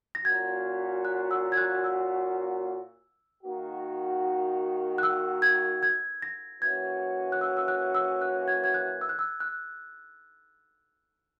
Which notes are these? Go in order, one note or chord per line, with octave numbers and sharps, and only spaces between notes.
A#6
A#2 A#3 C#4 F#4 G#6
F#6
E6
G#6
F#6
E6
D#3 A#3 D#4 F#4
F#6
E6
G#6
G#6
A#6
E3 A#3 C#4 F#4 G#6
F#6
E6
E6
F#6
E6
F#6
G#6
G#6
F#6
E6
F#6
E6
F#6